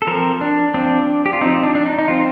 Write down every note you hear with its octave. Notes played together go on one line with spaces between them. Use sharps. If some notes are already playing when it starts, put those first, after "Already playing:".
A4
F3 C4 A#4
D4
F3 C4 D4
G4
F4
F3 C4 D#4
D4
D4
D#4
D#4
F3 C4 F4